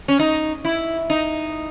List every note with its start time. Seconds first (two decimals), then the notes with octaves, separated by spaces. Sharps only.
0.08 C#4
0.19 D#4
0.65 E4
1.10 D#4